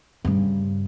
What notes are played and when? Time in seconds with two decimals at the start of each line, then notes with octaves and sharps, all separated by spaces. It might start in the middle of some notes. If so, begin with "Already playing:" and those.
0.25 G2 C#3